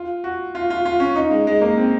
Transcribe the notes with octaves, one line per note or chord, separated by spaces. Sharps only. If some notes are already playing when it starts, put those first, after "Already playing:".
Already playing: F4
F#4
F4
F4
F4
C#4
D#4
G#3
G#3
A#3
C4